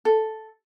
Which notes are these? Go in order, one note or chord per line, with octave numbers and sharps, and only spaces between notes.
A4